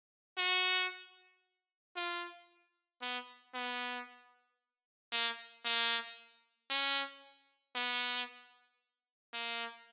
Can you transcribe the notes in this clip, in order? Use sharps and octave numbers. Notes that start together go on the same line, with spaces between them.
F#4
F4
B3
B3
A#3
A#3
C#4
B3
A#3